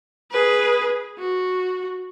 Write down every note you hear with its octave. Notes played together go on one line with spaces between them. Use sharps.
G#4 B4
F#4